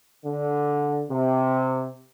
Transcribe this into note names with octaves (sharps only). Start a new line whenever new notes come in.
D3
C3